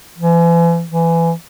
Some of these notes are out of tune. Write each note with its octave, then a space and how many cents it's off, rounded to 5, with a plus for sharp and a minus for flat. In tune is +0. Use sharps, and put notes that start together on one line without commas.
E3 +40
E3 +20